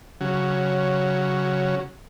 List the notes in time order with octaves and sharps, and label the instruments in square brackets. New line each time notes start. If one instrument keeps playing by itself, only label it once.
[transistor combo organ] C#3 F#3